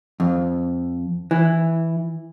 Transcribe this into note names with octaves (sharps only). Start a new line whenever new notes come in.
F2
E3